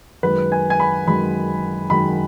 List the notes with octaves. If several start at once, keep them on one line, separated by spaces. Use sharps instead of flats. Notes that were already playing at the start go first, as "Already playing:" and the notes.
F#2 D#3 G#3 B4
G#5
G#5
B5
F#2 D#3 G#3 B5
F#2 D#3 G#3 B5